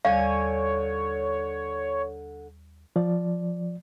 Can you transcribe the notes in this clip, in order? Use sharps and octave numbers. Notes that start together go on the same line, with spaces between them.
D#2 D3 G3 C#5 F5 G#5
F3 D5